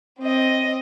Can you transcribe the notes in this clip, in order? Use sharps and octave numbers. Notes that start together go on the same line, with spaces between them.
C4 D#5